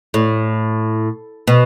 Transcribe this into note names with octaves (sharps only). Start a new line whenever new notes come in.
A2
B2